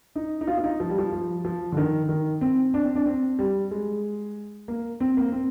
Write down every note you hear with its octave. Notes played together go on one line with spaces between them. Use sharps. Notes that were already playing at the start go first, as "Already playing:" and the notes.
D#4
D#4
F4
F4
D#4
F3
G3
F3
F3
F3
D3
D#3
D#3
C4
D4
C4
D4
C4
G3
G#3
A#3
C4
A#3
C4